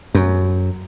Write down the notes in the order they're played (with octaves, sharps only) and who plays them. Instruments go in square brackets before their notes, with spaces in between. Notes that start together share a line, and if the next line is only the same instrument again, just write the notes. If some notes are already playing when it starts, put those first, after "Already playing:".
[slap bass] F#2